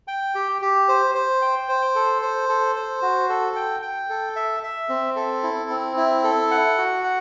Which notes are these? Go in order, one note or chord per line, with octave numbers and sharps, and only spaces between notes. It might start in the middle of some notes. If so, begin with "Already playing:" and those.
G5
G4
G4
C5
C5
G5
C5
A4
C5
A4
C5
F#4
A4
G5
G5
A4
E5
E5
C4
A4
E4
C4
E4
A4
F#5
F#4
F#5